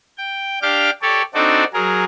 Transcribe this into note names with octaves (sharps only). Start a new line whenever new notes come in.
G5
D4 G4 F5 G5 D6 F6
G4 A4 C#5 D5
C4 D4 D#4 F#4 A4 D5
F#3 G#4 A#4